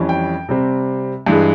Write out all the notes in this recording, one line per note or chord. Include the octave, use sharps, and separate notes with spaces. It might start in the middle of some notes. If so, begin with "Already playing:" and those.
Already playing: F2 E3 G3 C#4
G5
C3 G3 C4
G2 E3 G#3